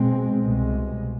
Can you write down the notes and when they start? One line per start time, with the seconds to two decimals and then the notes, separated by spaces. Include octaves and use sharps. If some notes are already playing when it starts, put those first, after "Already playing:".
Already playing: B2 G#3 C4
0.41 C2 B2 G#3